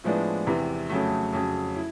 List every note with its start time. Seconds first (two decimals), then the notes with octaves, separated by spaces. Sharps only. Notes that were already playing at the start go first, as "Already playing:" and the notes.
0.04 A2 F3 G#3 B3 D4
0.46 E2 C3 E3
0.90 F2 C#3 F#3 A3
1.33 F2 C#3 F#3
1.76 E4